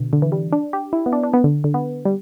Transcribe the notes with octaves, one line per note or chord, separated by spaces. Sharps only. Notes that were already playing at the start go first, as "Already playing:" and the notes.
Already playing: B2 D3
D3
E3
G3
D4
G4
E4
B3
D4
D4
B3
D3
D3
B3
G3